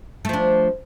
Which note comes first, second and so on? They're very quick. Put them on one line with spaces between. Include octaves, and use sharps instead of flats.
A3 F3 D4